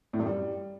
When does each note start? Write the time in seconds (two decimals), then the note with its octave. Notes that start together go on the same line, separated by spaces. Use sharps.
0.13 A2
0.19 F#2
0.26 G3